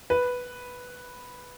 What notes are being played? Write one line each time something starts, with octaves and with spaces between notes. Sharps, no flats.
B4